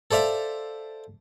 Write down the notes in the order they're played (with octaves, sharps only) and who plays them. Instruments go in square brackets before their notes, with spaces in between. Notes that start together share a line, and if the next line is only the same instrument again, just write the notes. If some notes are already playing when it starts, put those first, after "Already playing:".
[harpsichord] A4 C5 D5 E5 F5